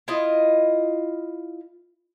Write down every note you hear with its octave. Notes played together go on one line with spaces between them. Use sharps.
E4 F4 D#5